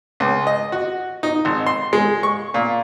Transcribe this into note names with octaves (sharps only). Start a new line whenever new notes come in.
C#2
D#5
F#4
D#4
G#1
C6
G#3
C#6
A#2